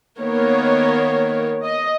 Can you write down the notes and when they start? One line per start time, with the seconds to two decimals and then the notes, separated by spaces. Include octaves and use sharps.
0.19 D#3 A#3 B3 A#4 C#5
1.64 D#5